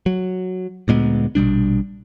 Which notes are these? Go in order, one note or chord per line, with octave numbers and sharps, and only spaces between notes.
F#3
D2 A#2 G#3 B3
A#1 B2 G3 D4